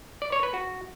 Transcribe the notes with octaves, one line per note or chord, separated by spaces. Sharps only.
D5
C#5
B4
F#4